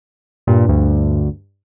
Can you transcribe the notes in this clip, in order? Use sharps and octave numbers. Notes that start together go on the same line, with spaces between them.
G2 A#2
D2